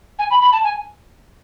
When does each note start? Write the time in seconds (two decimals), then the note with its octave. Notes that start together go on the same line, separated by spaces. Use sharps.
0.19 G#5
0.30 B5
0.41 B5
0.52 A5
0.64 G#5